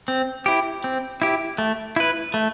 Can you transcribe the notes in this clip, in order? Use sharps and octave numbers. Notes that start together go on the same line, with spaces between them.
C4
E4 G4
C4
E4 G4
A3
E4 B4
A3